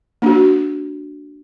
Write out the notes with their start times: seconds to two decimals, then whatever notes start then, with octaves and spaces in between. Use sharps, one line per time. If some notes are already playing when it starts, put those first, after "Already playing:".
0.22 A#3 D4 F#4